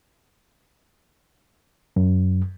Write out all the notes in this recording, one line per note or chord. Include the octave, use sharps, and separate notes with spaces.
F#2